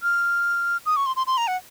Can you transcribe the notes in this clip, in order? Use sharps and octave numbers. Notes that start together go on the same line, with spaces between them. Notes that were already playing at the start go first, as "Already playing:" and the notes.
F6
D#6
C#6
C6
C6
C6
A#5
F#5